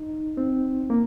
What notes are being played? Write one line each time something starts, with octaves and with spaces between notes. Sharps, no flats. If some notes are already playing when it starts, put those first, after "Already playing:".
Already playing: D#4
C4
A#3